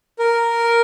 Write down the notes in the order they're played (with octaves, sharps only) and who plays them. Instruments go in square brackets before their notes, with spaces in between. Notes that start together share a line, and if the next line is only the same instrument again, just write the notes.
[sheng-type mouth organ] A#4